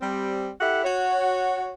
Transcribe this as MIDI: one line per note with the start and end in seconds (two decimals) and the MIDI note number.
0.01 0.50 55
0.01 0.50 60
0.61 0.81 64
0.61 0.81 67
0.61 0.81 69
0.61 0.81 78
0.83 1.71 66
0.83 1.71 73